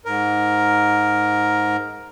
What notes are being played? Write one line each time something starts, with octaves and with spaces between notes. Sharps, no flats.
G#2 A#4